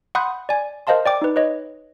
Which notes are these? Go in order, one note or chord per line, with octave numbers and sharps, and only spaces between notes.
F#5 B5 C6 D#6 F#6 G6
D5 G#5
A#4 C5 D#5 F5 A5 C6
D5 G5 D6
D#4 B4
B4 C#5 D#5